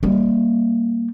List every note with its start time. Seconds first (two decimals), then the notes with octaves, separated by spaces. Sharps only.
0.03 G3 A#3